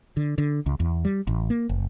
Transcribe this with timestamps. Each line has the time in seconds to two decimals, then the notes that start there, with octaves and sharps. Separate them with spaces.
0.17 D3
0.38 D3
0.66 C#2
0.80 E2
1.05 G3
1.27 A1
1.50 A#3
1.69 F#1